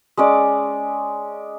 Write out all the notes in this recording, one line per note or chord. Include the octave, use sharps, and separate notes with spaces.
G#3 C#4 D5